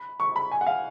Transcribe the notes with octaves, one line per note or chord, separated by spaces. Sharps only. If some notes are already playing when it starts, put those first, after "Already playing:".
Already playing: B5
C#6
B5
G#5
F#5
F5